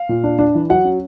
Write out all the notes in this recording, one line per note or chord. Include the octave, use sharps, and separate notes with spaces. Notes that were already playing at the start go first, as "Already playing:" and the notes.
Already playing: F5
A#2
D4
D4
E3
F#3 F#5
C#4